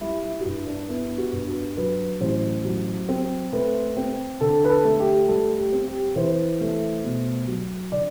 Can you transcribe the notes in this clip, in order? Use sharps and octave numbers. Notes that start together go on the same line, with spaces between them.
G3 E4
E4
F#4
G2 E4
D4
B3 E4
F#4
G2
F#4
F#3 B4
A1 C5
F#3
C4
A3 B4
C4
D3 A4
B4
A4
A3
G4
G3 A4
G4
C4
G4
E3 C5
A3
B2
F#3
D3 D5